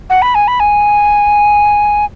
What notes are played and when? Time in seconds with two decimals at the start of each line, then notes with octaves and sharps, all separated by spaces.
0.10 F#5
0.22 B5
0.35 G#5
0.48 B5
0.60 G#5